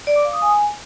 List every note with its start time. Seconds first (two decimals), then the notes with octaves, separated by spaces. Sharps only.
0.07 D5
0.16 D6
0.24 F5
0.33 D#6
0.42 G#5